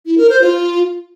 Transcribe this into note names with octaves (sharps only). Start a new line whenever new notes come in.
E4
A#4
C5
F4